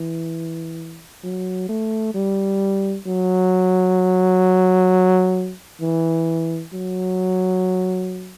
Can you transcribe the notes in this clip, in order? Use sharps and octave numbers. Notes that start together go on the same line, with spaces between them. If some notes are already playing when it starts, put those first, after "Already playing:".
Already playing: E3
F#3
A3
G3
F#3
E3
F#3